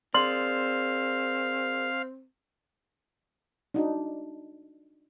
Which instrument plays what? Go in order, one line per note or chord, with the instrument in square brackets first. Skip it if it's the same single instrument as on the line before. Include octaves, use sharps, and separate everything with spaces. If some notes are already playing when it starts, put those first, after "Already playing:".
[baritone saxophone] C4 [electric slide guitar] G#4 A#4 D5 [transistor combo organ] F5 [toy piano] C6
[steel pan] D4 D#4 F#4